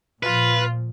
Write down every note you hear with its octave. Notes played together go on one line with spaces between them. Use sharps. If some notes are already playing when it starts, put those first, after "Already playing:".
A#2 F3 F4 B4